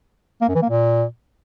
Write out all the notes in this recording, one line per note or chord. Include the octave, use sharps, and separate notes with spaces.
A#3
F#2
E3
A#3
A#2